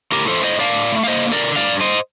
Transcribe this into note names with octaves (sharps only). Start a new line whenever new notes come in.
A2 G4 A#4
A3 A4 C5
A2 C5 D#5
D4 D5 F5
A2
A3
F5
A#3 C5 D#5
D3
A#4 D5
D3
G2 D5 F5
G2
C5 D#5